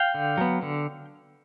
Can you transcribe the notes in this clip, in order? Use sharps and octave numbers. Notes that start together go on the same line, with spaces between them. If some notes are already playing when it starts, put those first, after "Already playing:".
Already playing: F5 G5
D3
F#3 B3
D3